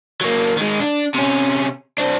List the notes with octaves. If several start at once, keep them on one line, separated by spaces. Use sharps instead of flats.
F#3 A#3
D#3 G#3
D4
C3 C#4
C4 D4